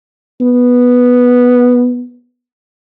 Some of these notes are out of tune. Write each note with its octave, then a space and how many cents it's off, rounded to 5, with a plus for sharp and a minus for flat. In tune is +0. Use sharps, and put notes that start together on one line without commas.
B3 -5